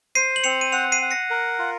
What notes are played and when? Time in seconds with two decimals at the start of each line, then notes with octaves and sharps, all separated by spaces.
0.15 C5 C7 D#7
0.36 F#7
0.44 C4 C#7 F7
0.61 D#7
0.72 F#5 C#7 F7
0.92 C7 D#7
1.02 F#5
1.11 A#6 C#7
1.30 A#4
1.59 F4